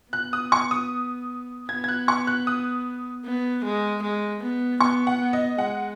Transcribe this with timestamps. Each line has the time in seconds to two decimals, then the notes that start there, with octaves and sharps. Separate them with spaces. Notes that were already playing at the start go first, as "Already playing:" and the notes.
0.13 B3 F#6
0.33 D#6
0.52 C#6
0.71 D#6
1.69 B3 G#6
1.84 G#6
1.89 F#6
2.08 C#6
2.27 F#6
2.47 D#6
3.24 B3
3.64 G#3
4.02 G#3
4.43 B3
4.81 B3 C#6
5.07 F#5
5.21 B3
5.33 D#5
5.58 G#3 F#5